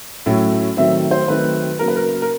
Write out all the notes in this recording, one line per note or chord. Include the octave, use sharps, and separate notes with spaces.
A2 F#3 A3 C#4
D#3 F#3 A3 C4 E5
C5
D#3 F#3 A3 C4 B4
C#3 F#3 A#3 A#4
B4
A#4
A#4